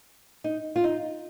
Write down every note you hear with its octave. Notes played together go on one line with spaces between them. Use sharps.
D#4
F4
D#4